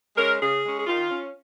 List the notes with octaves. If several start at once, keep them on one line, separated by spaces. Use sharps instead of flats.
G#3 C#4 A#4
C#3 G#4
G#3 C#4
G#4
D#3 F4
C#4